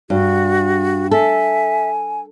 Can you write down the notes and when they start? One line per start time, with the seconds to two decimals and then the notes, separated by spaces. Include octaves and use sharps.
0.10 G2 F#4
1.11 A4 E5 G#5